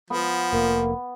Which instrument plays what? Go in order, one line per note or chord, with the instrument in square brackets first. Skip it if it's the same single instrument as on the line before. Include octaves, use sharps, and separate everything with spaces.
[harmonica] F3 [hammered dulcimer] B3
[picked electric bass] F1 [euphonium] A#3